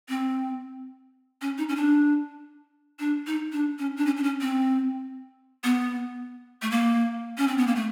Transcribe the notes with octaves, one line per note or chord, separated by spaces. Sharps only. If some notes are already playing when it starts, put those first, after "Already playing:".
C4
C#4
D#4
C#4
D4
D4
D#4
D4
C#4
D4
C#4
D4
C#4
C4
B3
A3
A#3
C#4
C4
B3
A#3
A3